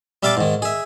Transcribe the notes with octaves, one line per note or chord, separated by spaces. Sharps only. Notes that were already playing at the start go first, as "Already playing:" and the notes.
G3 E5 F5 A5 D6
G#2 D#3
G#4 E5